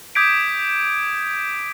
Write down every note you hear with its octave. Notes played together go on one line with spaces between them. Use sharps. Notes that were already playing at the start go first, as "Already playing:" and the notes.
D6 D#6 G6 G#6 B6 D7